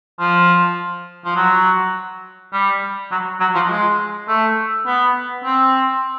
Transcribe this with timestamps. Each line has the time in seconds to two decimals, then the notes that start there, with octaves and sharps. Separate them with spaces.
0.20 F3
1.25 F3
1.36 F#3
2.53 G3
3.11 F#3
3.40 F#3
3.55 F3
3.70 G#3
4.28 A3
4.86 B3
5.44 C4